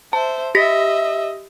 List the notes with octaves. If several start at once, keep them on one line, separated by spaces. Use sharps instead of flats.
C5 E5 A5
G4 D#5 E5 A#6 B6